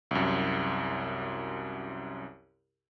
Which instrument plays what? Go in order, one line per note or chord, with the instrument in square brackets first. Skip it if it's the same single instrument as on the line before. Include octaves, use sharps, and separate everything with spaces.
[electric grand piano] C2 F#2